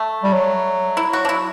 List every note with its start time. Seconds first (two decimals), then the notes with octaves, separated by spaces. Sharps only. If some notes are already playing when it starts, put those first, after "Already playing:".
Already playing: A3
0.23 G3
0.33 F#3
0.97 E4
1.13 F#4
1.25 D4
1.29 E4